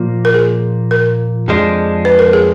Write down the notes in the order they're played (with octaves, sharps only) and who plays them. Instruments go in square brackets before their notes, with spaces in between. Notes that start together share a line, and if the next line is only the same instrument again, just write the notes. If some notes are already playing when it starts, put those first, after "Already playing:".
Already playing: [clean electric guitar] A#2 F3 A#3
[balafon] A#4
G#4
A#4
[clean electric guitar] F2 F3 G#3 D4
[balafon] B4
A#4
G#4